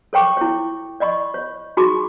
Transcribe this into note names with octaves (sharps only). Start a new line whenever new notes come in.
A4 C#5 G5 C#6 D6
E4 C#5
D5 D#5 B5 C#6
C#5
D#4 F#4 G#4 B5 C#6 D6